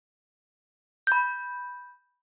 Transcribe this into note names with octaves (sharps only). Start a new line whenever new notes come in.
B5 G6